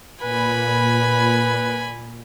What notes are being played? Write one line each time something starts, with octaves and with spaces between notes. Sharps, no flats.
A#2 B4 G#5 B5